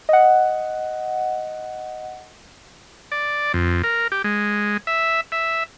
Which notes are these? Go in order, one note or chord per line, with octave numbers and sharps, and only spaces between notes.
D#5 F#5
D5
F2
A#4
G4
G#3
E5
E5